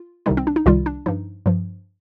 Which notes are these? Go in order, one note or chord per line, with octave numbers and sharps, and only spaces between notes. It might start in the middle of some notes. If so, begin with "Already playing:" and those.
Already playing: F4
C2 C3 D#3 G3 D#4
C4
D4
D#4
C2 C3 D#3 G3 F4
D4
G2 F3 D#4
G2 F3